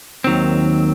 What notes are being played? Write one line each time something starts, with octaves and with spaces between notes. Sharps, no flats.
D#2 D#3 F#3 C4